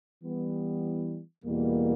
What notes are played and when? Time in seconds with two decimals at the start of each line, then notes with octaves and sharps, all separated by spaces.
0.23 E3 G3 B3
1.43 E2 B2 G3 A#3